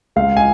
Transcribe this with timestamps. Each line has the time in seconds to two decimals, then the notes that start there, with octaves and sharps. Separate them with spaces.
0.16 C#2 F5
0.37 G#5